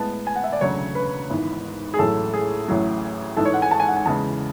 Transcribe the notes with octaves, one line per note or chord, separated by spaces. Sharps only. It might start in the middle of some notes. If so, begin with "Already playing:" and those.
Already playing: A2 G#3 B3 A5
G#5
F#5
E5
D5
E1 D2 C#3 F#3 C#5
B4
G#1 G#2 E3 B3
G#4
A1 A2 F#3 A4
G#4
A1 A2 F#3
G#2 E3 G#3 A4
C#5
F#5
G#5
A5
G#5
F#5
G#5
E2 C#3 E3 G#3 A5